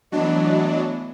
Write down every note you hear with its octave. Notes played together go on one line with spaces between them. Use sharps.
E3 F#3 A3 B3 D4 D#5